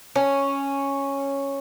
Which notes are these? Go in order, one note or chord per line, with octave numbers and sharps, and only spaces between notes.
C#4